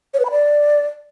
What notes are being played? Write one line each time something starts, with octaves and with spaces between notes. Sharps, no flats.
C#5
B4
B5
D5